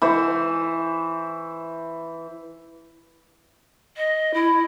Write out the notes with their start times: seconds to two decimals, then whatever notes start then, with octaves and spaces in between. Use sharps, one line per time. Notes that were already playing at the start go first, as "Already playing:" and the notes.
0.02 E3 C5 C6 C#6
3.97 D#5
4.34 E4